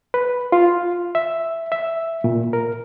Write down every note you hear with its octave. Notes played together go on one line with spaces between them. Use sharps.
B4
F4
E5
E5
A#2
A#4